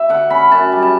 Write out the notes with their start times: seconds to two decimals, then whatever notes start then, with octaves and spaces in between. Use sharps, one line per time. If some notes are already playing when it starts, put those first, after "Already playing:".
Already playing: E5
0.09 D3 F#5
0.30 C#4 B5
0.51 F#2 A5
0.72 G3
0.82 A5